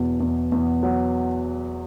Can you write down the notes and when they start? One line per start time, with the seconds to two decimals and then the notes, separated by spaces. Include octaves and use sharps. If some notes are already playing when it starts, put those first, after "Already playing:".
Already playing: E2 B2 F#3
0.20 E2
0.52 E2
0.83 F#3